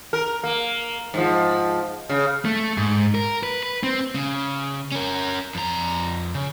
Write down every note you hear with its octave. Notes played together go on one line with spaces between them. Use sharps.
A#4
A#3
G#2 F3
C#3
A3
G#2
A#4
B4
B4
C4
C#3
C#4 A#4
F2 A#5
C#3